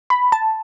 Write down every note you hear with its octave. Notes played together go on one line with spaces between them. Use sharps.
B5
A5